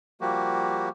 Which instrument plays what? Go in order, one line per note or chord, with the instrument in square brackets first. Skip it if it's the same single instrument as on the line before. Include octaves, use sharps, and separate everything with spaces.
[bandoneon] F3 G3 A#3 F#4 G4